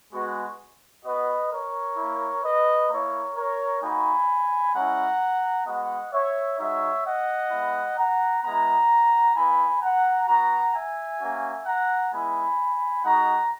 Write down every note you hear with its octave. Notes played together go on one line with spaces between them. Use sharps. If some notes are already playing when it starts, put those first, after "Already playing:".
G#3 B3 F#4
B3 F#4 B4 D#5
A#4 C#5
A#3 E4
B4 D#5
A#3 E4 A#4 C#5
A#4 C#5
A#3 D#4 F#4 G#5 B5
G#3 C#4 E4 F#5 A#5
G#3 B3 F#4 D#5 F#5
C#5 E5
G#3 D#4 F#4 C#5 E5
D#5 F#5
G#3 B3 E4
F#5 A#5
G#3 B3 E4 F#5 A#5
B3 E4 G#5 B5
F#5 A#5
B3 F#4 F#5 A#5
E5 G#5
A#3 C#4 F#4
F#5 A#5
G#3 B3 E4 G#5 B5
G#3 D#4 F#4 F#5 A#5